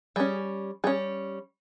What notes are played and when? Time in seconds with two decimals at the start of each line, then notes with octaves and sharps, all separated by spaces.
0.16 G3 C#4 G#4
0.84 G3 G#4
0.87 C#4